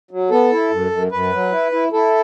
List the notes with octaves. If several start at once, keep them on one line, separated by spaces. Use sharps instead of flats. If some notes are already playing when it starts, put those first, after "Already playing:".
F#3
B3 A4
E4
F#2
F#2
F#2 B4
F#3
E4
E4
E4 A4